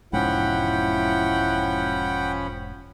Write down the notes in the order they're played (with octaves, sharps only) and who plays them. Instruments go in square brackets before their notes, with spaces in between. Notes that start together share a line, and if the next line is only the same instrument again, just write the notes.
[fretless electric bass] E1 G#2 [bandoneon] F3 C#4 B5 [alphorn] E4 [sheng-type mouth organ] F#5 G5